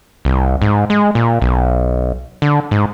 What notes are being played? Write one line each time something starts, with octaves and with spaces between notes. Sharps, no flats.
C2
G#2
G#3
A#2
B1
D3
G#2